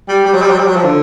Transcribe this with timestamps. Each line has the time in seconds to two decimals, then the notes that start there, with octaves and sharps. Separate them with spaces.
0.08 G3
0.25 G3
0.34 F#3
0.42 G3
0.51 F#3
0.59 G3
0.67 F#3
0.76 F3
0.84 D3